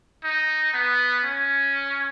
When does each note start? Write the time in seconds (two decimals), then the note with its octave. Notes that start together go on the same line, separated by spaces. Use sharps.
0.24 D#4
0.74 B3
1.24 C#4